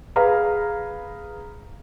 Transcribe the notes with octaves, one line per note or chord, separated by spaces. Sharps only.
G#4 B4 F5 A#5